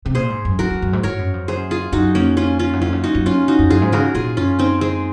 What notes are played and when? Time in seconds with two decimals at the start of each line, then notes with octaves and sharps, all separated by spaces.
0.06 C3
0.14 A#2 G#4 C5
0.30 G#2
0.45 F#2
0.59 F#2 F#4 A#4
0.70 F#2
0.82 F#2
0.93 G#2
1.03 G#2 A#4 C#5
1.19 F#2
1.33 F2
1.48 F#2 G#4 C5
1.71 F4 G#4
1.92 F#2 D#4 F#4
2.15 F2 A#3 C#4
2.37 C#4 F4
2.59 C#4 F4
2.73 F#2
2.81 F2 C#4 F4
2.93 F#2
3.04 D#4 F#4
3.15 F#2
3.26 C#4 F4
3.48 D#4 F#4
3.59 F2
3.70 F#2 F4 G#4
3.82 G#2
3.92 C#3 F#4 A#4
4.14 A#2 F4 G#4
4.37 F#2 C#4 F4
4.59 C4 D#4
4.81 G#3 C4